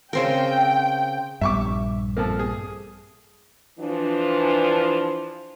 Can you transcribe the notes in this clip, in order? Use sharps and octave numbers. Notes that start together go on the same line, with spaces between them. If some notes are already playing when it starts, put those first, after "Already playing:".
C#3 C4 A#4 G5
A#1 G2 E5 C#6 D6
F3 A3 A#3
G#4
E3 F3 D4